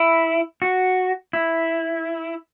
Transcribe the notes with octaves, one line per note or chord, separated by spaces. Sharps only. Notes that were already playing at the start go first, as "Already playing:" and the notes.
Already playing: E4
F#4
E4